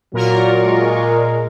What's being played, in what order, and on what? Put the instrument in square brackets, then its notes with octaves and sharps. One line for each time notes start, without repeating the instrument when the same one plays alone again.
[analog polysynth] A#2 A#4 [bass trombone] F#3 [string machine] F4 D5 C#6
[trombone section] G#3